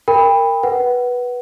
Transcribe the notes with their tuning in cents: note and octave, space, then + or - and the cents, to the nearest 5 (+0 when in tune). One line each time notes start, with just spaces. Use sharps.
A#4 -15 G5 +30 B5 +0
B4 -10 F#5 +20